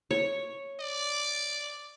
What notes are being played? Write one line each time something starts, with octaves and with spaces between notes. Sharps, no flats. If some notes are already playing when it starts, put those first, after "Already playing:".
C#5
D5